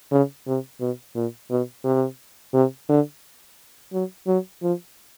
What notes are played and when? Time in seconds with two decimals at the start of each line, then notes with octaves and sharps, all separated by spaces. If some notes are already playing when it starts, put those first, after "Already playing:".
0.11 C#3
0.47 C3
0.80 B2
1.15 A#2
1.51 B2
1.85 C3
2.54 C3
2.89 D3
3.93 F#3
4.27 F#3
4.62 F3